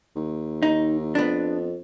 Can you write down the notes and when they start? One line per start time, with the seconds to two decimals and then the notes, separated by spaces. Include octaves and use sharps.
0.16 D#2
0.63 D#4
1.15 F2 B3 D4